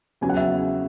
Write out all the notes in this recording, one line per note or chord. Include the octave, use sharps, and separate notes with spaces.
E2 C#3 F#3 G#5
F#5
E5